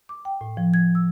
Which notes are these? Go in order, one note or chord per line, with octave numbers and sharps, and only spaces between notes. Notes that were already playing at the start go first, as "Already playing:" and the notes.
D6
G5
A2
F3
G#6
E6